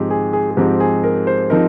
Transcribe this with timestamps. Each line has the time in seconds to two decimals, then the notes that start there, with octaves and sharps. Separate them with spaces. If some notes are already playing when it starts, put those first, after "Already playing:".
Already playing: G#2 F3 C4 D#4 G4 G#4
0.10 G#4
0.33 G#4
0.51 G#4
0.57 G#2 F3 C4 D#4 G4
0.80 G#4
1.04 A#4
1.27 C5
1.50 F3 C4 D#4 A#4